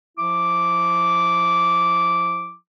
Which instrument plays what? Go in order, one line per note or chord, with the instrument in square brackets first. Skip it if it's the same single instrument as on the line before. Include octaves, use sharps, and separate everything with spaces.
[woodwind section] F3 E4 D6